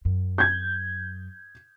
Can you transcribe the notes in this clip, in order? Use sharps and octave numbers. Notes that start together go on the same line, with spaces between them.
F#2
G6 G#6